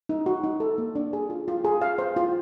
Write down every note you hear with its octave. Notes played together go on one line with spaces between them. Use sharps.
D#4
F#4
D#4
A4
A#3
D4
G#4
F4
F4
G#4
F5
C5
F4